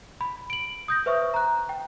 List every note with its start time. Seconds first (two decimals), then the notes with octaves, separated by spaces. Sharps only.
0.21 B5
0.50 D7 F#7
0.88 D#6 G6 A#6
1.06 B4 C5 E5 C#6
1.34 A#5 F#6
1.69 G5